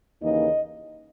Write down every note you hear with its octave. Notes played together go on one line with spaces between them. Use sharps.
D#2 C#3 E3 A#3 D#4 D#5